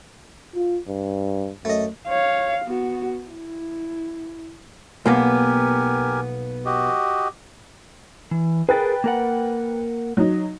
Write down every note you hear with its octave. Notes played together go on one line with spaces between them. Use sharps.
F4
G2
F#2 A3 D#5
C#5 F5
B3 F#4
E4
B1 A#3 B3 G4 A#4 G#5
F#4 G4 D#5
E3
G#4 A#4 B4 G5 A6
A#3 A#4 F#5
F#3 D#4